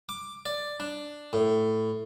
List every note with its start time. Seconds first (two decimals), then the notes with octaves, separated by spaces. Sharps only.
0.09 D6
0.46 D5
0.80 D4
1.33 A2